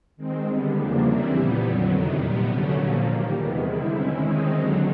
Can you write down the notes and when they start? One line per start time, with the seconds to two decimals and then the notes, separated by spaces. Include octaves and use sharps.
0.17 D#3 G#3 C4
0.45 D3 G3 B3
0.74 E2 C#3 F3 A#3 D4
1.03 E3 G3 C4 E4
1.32 A#2 G3 B3
1.60 F2 D3 F#3
1.90 E2 C3 D#3
2.18 A#2 G3 B3
2.47 D3 F#3 A3 C#4
2.76 A#2 F3 A#3
3.06 D#3 G3 A#3
3.34 E2 C3 D#3 G#3 B3
3.63 D3 G3 C4 E4
3.91 D#3 G#3 C#4 E4
4.20 D#3 G#3 C4 D#4
4.50 D#2 D3 F#3